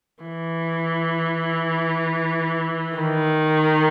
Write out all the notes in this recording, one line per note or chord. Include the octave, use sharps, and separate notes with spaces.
E3
D#3